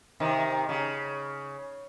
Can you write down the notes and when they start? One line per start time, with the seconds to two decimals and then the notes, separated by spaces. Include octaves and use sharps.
0.20 C3 D#3
0.69 C#3